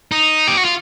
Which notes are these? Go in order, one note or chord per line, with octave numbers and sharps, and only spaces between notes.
D#4
G4
F#4
F4